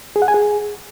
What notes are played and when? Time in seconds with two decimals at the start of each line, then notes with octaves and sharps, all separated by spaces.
0.16 G#4
0.22 F#5
0.28 G#5
0.34 G#4